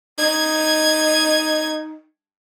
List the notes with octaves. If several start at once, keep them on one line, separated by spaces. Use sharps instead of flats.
D#4 G#6